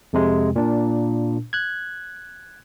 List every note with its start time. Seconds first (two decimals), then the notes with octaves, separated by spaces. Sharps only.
0.13 F2 C3 G#3
0.56 A#2 D4
1.53 F#6 G#6